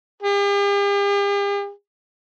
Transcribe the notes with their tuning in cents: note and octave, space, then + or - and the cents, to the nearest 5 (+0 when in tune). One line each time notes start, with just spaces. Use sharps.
G4 +45